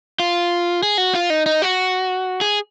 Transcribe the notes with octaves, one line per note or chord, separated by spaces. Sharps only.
F4
G#4
F#4
F4
D#4
D#4
F#4
G#4